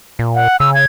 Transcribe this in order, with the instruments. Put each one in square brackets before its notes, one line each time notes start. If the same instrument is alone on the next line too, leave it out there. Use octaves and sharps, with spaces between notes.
[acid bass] A#2
[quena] F#5
[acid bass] C#3 [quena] E6
[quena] G#6